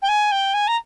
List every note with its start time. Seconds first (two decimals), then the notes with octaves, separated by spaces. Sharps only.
0.02 G5
0.08 G#5
0.31 G5
0.54 G#5
0.67 A#5